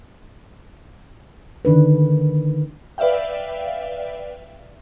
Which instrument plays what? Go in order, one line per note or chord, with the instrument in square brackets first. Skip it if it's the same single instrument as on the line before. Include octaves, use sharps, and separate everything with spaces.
[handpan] D3 D#3 D4 B4
[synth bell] B4 D5 E5 F5 G5